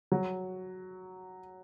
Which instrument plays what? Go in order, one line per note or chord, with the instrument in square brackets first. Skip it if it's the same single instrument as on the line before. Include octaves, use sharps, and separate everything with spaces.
[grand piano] F#3